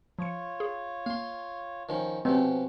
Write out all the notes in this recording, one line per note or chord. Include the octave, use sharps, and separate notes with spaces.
F3 F4 C#5 C#7
G#4
A#3 F5 C6
D#3 F3 C#4
B2 F3 C4 C#4